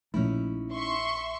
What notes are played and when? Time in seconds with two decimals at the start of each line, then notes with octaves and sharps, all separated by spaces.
0.14 A#1 A#2 F3 A3 C#4 D#4 E4
0.73 E5 C6 C#6